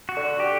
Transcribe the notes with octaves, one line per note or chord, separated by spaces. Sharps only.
F#4
D3
G4